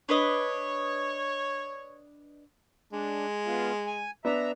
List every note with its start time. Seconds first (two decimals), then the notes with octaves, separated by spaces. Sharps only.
0.09 D4 B4 C#5 D#5
2.93 G#3 D4
3.47 B3 F4
3.87 G#5
4.25 B3 D4 E5 A#5